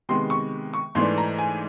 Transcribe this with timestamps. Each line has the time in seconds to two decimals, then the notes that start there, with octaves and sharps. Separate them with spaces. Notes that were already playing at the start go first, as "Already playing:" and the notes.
0.09 C3 D#3 G#3 B3 C6
0.30 C#6
0.74 C#6
0.95 G#2 E3 A3 D4 C6
1.18 A#5
1.39 G#5